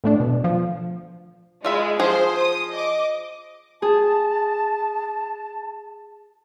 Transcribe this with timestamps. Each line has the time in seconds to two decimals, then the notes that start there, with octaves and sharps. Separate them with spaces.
0.04 A2 A3 D4
0.20 B2
0.44 F3
1.65 G#3 F4 E5 B5
2.00 F3 G#4 C5 C6
2.37 D#6
2.71 D#5 D6
3.82 G#4 A5